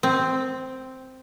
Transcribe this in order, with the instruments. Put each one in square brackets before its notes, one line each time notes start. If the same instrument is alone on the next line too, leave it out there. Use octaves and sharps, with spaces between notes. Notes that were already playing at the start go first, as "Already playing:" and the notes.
[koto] C4